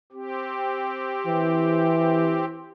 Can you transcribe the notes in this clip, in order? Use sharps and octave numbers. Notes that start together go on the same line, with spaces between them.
C4 G4
E3